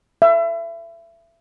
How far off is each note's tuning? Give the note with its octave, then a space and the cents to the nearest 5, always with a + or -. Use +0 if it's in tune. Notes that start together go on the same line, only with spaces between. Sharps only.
E5 +30